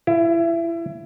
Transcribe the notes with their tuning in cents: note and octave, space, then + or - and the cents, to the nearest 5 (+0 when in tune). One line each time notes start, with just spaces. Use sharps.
E4 +25